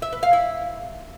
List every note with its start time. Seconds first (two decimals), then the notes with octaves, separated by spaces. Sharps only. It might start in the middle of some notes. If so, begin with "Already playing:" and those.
0.02 E5
0.12 B4
0.23 F5
0.33 E4